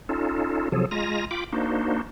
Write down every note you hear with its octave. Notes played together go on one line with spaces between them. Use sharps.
C#4 D#4 F4 A4
C3 F3 F#3 G#4 A4
G#3 F4 G#5 A#5 A#6
F4 G5 B5 D6
A#3 D4 D#4 F#4 C5